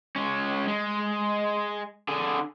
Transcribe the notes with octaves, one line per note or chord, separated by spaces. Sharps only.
G#3 C#4
G#3
D3 G#4